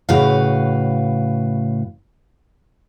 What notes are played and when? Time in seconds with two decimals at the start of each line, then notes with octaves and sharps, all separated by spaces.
0.09 A2 C#3 F#4 B4 F5